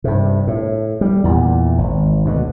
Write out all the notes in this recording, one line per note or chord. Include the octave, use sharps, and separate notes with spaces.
G2 C3
A2
G3
E2 A#2
G#1
D2 B2